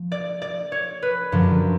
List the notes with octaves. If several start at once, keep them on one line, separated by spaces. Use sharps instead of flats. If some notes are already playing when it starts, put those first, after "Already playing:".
Already playing: F3
D5
D5
C#5
B4
F#2 D3 F3